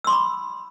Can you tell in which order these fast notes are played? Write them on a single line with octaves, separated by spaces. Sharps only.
E6 C6 D6 B5